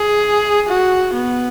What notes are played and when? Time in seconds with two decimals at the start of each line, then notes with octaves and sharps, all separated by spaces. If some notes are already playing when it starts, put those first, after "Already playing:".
Already playing: G#4
0.69 F#4
1.14 B3